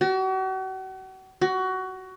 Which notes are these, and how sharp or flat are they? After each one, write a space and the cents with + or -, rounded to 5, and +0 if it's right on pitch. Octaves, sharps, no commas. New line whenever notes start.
F#4 +40
F#4 +20